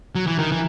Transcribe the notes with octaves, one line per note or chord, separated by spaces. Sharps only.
F#3
E3
D#3
E3